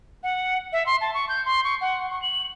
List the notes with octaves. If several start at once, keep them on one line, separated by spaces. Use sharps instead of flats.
F#5
E5
C6
A5
C#6
G6
C6
C#6
F#5
C#6
F#7